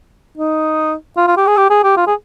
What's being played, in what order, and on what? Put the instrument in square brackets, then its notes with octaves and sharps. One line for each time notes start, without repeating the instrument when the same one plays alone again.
[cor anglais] D#4
F4
F4
G4
G#4
G4
G#4
G4
F4
G#4